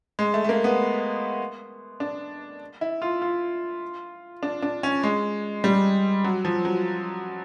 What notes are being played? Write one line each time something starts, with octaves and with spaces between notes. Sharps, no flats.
G#3
A3
A3
A#3
B3
D4
E4
F4
F4
D4
D4
C#4
G#3
G3
F#3
F3
F#3